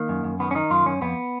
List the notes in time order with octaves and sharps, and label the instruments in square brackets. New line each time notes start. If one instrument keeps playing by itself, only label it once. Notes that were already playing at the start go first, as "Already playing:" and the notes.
Already playing: [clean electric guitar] D#3 A#3
F#2
F#2
D#3 B3
C#4
D#3 D#4
F#2 F4
F#2 C#4
F2 B3